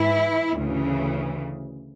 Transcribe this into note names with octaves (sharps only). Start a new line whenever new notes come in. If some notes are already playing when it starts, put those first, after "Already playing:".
Already playing: G#2 E3 E4
D2 C#3 E3